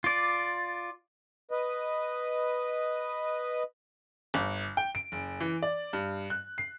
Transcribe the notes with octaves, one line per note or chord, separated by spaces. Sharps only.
F4 D5
B4 D#5
G1
G5
D7
F#1
E3
D5
G2
F#6
C7